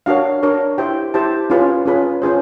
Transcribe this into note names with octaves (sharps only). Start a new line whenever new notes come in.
D4 F#4 A#4 C#5 F5
D4 F#4 A#4 C#5
E4 G4 C5 G5
E4 G4 C5 A5
C#4 F4 G#4 B4
C#4 F4 G#4 B4
C#4 F4 G#4 C5